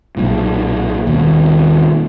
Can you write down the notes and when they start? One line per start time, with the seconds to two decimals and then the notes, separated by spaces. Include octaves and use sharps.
0.17 B1 A#2
1.07 D#2 B2